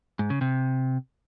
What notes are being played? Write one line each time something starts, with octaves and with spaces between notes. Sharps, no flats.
G#2
C#3
C3